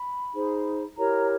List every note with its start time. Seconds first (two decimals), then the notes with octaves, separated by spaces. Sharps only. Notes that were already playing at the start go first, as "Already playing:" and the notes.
Already playing: B5
0.33 D#4 G#4 C5
0.97 E4 G4 A#4 C#5 A#5